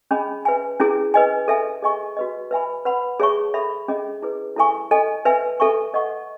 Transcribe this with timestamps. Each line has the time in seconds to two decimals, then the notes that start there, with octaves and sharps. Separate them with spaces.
0.11 C#4 G#4 D#5 G#5 B5
0.45 B4 E5 G#5
0.80 C#4 E4 G#4
1.14 B4 D#5 G#5
1.48 A4 E5 G#5
1.82 G#4 D#5 G#5 C#6
2.17 F#4 B4 D#5
2.51 B4 E5 G#5 B5
2.85 B4 F#5 B5
3.20 G#4 C#5 E5 A5 C#6
3.54 A4 E5 B5
3.88 C#4 G#4 D#5
4.22 E4 G#4 B4
4.56 E4 A4 E5 G#5 C#6
4.91 A4 D#5 G#5
5.25 B4 E5 G#5
5.60 A4 E5 G#5 C#6
5.94 A4 D#5 F#5 C#6